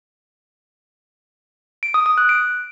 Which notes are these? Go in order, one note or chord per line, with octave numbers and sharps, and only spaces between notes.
D7
D#6
D#6
F#6
D7